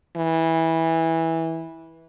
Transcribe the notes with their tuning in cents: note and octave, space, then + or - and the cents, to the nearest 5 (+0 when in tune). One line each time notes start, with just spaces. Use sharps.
E3 -15